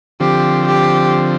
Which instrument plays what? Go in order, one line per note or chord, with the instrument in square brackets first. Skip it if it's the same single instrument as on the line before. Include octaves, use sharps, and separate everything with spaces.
[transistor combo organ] D3 F3 C4 [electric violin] G4
[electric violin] G4